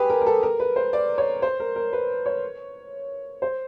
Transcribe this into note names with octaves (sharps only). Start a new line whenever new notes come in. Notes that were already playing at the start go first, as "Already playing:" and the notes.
Already playing: G4 G#4 B4
A#4
A#4
A4
A#4
B4
C5
D5
C#5
C5
A#4
A#4
B4
C#5
C5